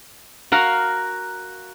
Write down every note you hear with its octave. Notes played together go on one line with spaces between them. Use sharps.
F#4 A#4 F5